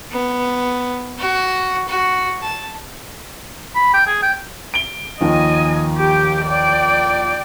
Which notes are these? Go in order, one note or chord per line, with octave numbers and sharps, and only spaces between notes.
B3
F#4
F#4
A5
B5
G5
G#4
G5
D7 G7
D#2 D#3 F3 D#5 G#5
G4 G5
D5 G5